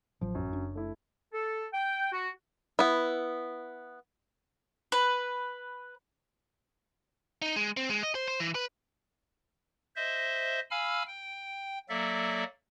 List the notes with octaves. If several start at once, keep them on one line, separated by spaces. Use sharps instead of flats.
A1 F3 F#3
F#2
F#1 D4
A3 E4
A4
G5
F#4
B3 E4
B4
D#4
G#3
C4
G#3
D#5
C5
C5
E3
B4
C5 D#5 E5
F5 G#5 B5 E6 F6
G5
F#3 A#3 A4 D5 E5